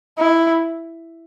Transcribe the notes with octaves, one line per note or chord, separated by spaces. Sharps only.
E4